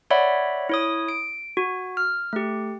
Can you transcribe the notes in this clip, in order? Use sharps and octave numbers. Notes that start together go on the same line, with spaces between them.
C#5 D5 E5 F#5 B5
E4 C#5 D#6
D7
F#4
F6
A3 G4